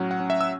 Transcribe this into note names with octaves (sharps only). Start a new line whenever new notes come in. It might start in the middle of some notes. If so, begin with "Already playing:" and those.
Already playing: A2 F#3 C#4 F#5
F#5
C#4
E5
E6